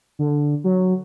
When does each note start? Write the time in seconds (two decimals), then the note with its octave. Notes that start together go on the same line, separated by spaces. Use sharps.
0.19 D3
0.64 F#3